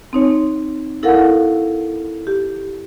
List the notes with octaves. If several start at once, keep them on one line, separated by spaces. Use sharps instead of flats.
C4 D#4 C#5
E4 A4 A#4 F5 F#5
G4